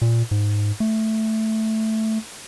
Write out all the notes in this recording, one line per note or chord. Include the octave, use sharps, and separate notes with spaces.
A#2
G#2
A3